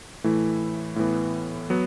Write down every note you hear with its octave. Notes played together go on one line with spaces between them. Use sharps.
A2 E3 A3 E4
A2 E3 B3
F#3 B3